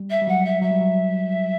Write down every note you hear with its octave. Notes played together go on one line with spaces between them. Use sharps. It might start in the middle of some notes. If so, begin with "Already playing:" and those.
Already playing: G3
E5
G3
F#3 F#5
E5
F#3 E5
G3
F#3